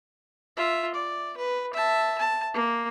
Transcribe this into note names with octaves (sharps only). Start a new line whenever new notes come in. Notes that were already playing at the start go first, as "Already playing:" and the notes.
F4 E5
D5
B4
E5 A5
A5
A#3